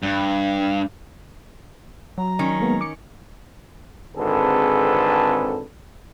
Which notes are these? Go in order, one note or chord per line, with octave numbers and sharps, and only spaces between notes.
G2
F#3 A#5
D#3 C#4
G#3 A#3 B3
D6 C#7
G#1 D3 C4 G#4 A4 B4